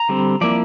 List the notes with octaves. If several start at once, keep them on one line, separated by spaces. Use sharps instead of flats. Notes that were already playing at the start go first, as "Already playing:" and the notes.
Already playing: A#5
D3 G3 C4
F3 A#3 E4 D5